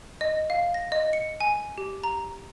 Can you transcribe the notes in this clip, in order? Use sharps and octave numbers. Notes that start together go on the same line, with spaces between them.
D#5
F5
A#6
D#5
C#7
G#5
G4
A#5